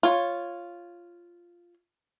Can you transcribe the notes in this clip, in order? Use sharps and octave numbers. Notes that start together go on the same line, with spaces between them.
F4 C#5